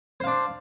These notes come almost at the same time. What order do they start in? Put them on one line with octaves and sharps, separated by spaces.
C5 F5 D4